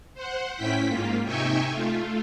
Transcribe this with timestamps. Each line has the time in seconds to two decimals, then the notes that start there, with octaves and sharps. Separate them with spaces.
0.14 C5 F#5
0.56 A2 C#4 E4 G5 B6
0.87 G#2 A#3 F4
1.24 C3 D#4 E5 G5 G#5 C#6
1.69 A3 F4